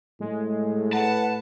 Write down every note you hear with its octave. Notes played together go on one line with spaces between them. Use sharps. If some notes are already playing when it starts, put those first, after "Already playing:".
A2 G#3
B4 F#5 A5